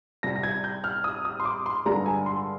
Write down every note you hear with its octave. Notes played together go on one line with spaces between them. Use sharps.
C2 C3 G3 A#6
A#6
G#6
G6
F6
D#6
D#6
C6
D6
C6
G2 D3 G#3 A#5
G#5
C6